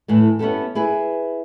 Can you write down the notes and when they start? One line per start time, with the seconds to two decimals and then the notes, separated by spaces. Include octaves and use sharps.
0.08 A2 E3 A3
0.39 B3 C#4 E4 G4 A4
0.75 E4 G#4 B4